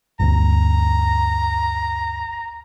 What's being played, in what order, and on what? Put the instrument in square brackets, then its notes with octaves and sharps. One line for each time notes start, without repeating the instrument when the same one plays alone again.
[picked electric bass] G1 D2 [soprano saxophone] A#5